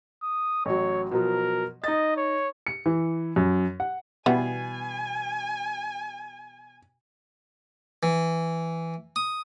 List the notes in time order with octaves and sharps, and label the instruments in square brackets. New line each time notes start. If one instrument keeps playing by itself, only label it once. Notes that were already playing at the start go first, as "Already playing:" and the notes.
[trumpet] D#6
[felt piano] A1 F#3 [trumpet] C#5
[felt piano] B2 F3 F#3 [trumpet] A#4
[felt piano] D#4 A6 [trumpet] D#5
[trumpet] C#5
[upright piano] C#7
E3
F#2
F#5
[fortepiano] B2 [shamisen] E3 G3 B3 [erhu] G#5
[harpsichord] E3
D#6